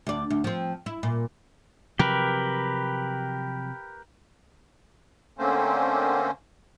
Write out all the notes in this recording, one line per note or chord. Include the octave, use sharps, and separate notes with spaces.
D2 D5
D2
F3 C4
E4
A#2
C3 F3 F#3 G4 A#4 B4
D3 A3 A#3 C4 C#4 C5